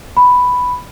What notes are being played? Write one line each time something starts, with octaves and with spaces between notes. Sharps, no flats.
B5